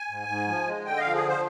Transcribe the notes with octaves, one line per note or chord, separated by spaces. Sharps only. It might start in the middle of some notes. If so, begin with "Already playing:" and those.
Already playing: G#5
G#2
G#2
F3
G#3
D3 G5
D#5
F5
F3
G#4
C5